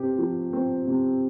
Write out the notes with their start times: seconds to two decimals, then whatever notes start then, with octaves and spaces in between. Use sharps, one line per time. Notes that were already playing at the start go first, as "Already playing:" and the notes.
Already playing: C3 C4 G4
0.18 F3
0.53 C4
0.87 C3